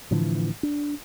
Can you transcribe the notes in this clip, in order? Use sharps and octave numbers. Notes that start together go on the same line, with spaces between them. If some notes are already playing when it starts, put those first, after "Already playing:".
A2 D3 E3 F3
D4